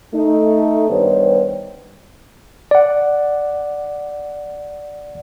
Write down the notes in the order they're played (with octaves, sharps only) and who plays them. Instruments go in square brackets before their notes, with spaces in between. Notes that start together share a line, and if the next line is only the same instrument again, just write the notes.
[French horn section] A3 D#4
G2 D#3 G3 B3 C5 C#5
[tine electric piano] D5 F#5